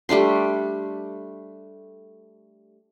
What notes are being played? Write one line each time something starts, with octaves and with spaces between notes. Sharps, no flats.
G3 A3 D4 C6